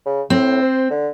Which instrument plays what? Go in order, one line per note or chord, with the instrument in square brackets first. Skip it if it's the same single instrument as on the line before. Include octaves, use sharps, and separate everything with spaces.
[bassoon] C#3
[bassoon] A2 [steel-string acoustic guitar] C4
[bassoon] C5
D3